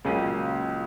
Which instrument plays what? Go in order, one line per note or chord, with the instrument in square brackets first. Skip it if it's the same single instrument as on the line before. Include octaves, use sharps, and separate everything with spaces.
[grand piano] C#2 C#3 [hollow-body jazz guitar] A#2 F#3 A#3 C#4